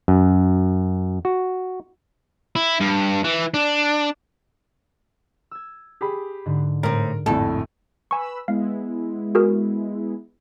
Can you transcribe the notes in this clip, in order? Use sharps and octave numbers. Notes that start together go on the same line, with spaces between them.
F#2
F#4
E4
G2
E3
D4
E6 G#6
G4 G#4 B5
G#2 D3
A2 C4 A#4
A#1 F2 A2 A4
B4 G#5 B5 C#6 E6
G#3 B3 E4 F5
F#4 G#4 A#4